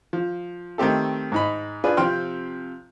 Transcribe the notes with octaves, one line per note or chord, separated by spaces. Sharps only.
F3
D#3 A3 C4 G4 A4
G#2 D#4 B5
D4 F4 G#4 B4
C3 F3 C4 G5 C6 F6